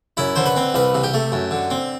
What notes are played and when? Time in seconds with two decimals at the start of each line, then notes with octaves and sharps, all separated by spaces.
0.17 F#2 E4
0.36 D3 C5
0.46 B4
0.56 C4
0.74 C2 B4
0.95 C3
1.04 G4
1.14 A3
1.32 F#2
1.51 D3
1.71 C4